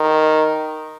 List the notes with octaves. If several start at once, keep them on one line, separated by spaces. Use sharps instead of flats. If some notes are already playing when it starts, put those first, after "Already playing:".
Already playing: D#3